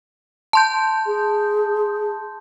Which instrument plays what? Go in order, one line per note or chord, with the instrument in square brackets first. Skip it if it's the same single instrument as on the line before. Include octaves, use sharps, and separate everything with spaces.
[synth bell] A5 C6 G6
[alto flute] G#4